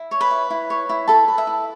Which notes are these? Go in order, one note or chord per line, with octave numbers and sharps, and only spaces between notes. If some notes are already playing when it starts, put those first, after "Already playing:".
Already playing: E4
C#5
B4 B5
E4
E4
C#5
E4
A4 B4 A5
B4
E5
E4